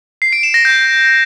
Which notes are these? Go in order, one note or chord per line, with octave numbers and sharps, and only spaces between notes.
C7
D7
E7
A#6
G6